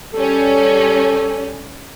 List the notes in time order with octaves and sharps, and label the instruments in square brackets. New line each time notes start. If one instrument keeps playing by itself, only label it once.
[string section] G3 C#4 [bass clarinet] A4